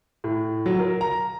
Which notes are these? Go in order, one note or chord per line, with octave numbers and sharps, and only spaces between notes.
A2
F#3
A#4
A#5